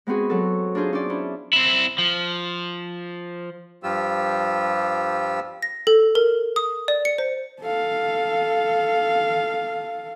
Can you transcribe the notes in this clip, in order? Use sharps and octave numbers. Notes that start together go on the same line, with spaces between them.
G#3 B3 C4 F#4 G#4
F#3 A4
D4 D#4 F4 G#4 C5
C#4 D4 C5 D5
C#4 D4 E4
C4 E4
F3
G2 F3 G3 F4 G4 E6
A#6
A4
A#4
D#6
D5
C#7
C5
A4 F5